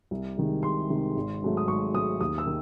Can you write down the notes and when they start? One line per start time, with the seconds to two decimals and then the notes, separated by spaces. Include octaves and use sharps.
0.11 C2
0.37 C3 D#3 G#3
0.63 C2 C6
0.90 C3 D#3 G#3
1.16 G#1
1.43 G#2 F#3 A3
1.57 D#6
1.68 G#1 C#6
1.94 G#2 F#3 A3 D#6
2.21 D#2 D#6
2.38 E6
2.47 D#3